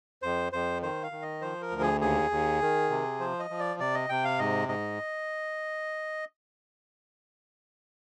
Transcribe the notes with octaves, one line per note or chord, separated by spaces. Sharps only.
F2 C5
F2 C5
D#3 C5
F5
D#3
D#5
F3 C5
A#4
D2
G#4
D#2 G#4
D#2
D#3
C3
F3 C5
D#5
F3
D5
C3 D5
D#5
C3 G5
F5
G#2 D#5
G#2 D#5